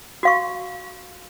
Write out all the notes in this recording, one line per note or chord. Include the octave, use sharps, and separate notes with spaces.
F#4 F5 C#6